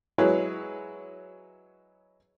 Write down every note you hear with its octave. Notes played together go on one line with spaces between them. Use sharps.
F#3 G#3 E4 G#4 B4 C#5